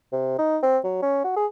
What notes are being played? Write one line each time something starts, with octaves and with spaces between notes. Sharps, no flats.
C3
D#4
C4
F#3
C#4
F#4
G#4